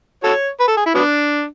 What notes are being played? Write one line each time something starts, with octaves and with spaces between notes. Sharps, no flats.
F#4 A4 C#5
B4
A4
G#4
E4
F#3 B3 D4